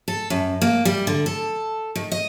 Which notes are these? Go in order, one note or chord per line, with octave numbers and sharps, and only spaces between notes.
A4
F#2
A#3
G3
D3
A4
D#3
D#5